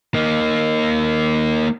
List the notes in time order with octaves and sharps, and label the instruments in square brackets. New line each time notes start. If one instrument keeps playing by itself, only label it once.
[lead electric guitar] A#3 D#4